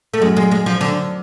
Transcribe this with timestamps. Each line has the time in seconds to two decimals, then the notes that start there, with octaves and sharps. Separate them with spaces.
0.14 A3
0.21 F#2 G#3
0.37 G#3
0.51 G#3
0.66 F3
0.81 D3